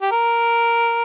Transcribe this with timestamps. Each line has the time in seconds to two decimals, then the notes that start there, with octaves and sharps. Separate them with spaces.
0.02 G4
0.12 A#4